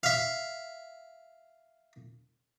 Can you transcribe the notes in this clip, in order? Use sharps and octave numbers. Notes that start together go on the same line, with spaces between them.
E5 F5